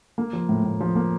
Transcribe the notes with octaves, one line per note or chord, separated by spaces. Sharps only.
A#3
F3
A2
A2
F3
A#3